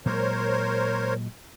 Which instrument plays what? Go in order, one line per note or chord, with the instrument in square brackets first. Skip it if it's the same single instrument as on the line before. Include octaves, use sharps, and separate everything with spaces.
[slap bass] A#2 F#3 G#3 [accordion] A#4 C5 C#5